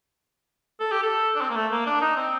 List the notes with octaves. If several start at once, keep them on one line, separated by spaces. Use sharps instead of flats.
A4
G4
A4
D4
C4
A#3
A3
A#3
D4
D#4
C4